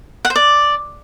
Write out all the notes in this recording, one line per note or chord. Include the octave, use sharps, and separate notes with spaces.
F#5
C5
D5